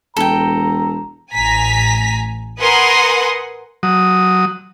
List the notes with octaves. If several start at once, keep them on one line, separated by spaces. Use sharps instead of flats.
E1 A4 G5 A#5
A1 G#5 A#5 B6
A#4 B4 F#5 G#5 C6 D#6
F#3 D#6